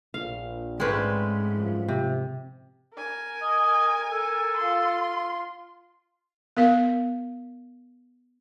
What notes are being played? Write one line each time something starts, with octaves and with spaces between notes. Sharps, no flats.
A#1 F5
G#2 G#3 A3 C4 C#4 B4 D5
F#2 F3
C3
A#4 G#5
D#5
A4
F4 C6
B3 A#4 F5